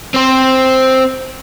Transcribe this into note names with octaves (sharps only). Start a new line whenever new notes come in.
C4 C5